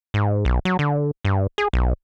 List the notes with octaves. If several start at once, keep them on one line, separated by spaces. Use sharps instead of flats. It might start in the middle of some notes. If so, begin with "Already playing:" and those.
G#2
B1
F#3
D3
G2
G#4
B1